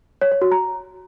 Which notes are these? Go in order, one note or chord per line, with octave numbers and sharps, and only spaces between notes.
C#5
C#5
F#4
A#5